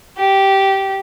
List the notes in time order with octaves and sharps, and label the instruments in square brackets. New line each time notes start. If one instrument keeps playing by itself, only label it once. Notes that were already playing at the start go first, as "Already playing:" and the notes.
[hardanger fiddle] G4